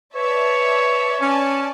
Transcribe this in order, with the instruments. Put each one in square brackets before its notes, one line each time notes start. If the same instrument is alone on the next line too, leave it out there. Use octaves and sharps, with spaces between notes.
[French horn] B4 [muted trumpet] C#5 [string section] D5 E5 A5
[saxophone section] C#4 [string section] D5 G#5 A5